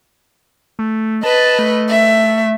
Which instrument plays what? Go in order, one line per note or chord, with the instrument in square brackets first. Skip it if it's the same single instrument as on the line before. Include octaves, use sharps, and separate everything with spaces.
[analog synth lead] A3
[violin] B4 D#5 [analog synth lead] A5
[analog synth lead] A3
[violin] E5